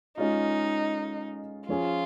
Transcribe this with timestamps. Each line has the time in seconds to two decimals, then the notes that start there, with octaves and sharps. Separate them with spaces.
0.18 G#3 C#4 D#4 F4
1.69 F3 C#4 F4 G#4